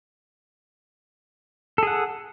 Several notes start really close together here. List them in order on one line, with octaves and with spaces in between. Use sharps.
A4 G#4 F#5